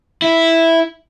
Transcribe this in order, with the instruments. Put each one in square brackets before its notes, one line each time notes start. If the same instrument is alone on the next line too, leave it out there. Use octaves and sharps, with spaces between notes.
[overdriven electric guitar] E4